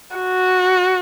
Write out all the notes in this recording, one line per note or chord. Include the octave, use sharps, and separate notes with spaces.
F#4